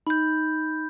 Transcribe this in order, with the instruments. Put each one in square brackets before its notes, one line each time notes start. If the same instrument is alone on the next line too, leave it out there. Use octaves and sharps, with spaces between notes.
[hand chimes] D#4 [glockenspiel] B5 G6